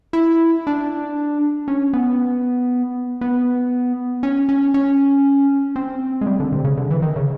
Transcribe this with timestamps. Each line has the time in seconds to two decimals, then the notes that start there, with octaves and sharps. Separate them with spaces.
0.13 E4
0.67 D4
1.68 C#4
1.93 B3
3.21 B3
4.23 C#4
4.49 C#4
4.74 C#4
5.76 C4
6.21 G#3
6.27 G3
6.40 D3
6.52 C3
6.64 C#3
6.77 D3
6.90 E3
7.02 D#3
7.16 C#3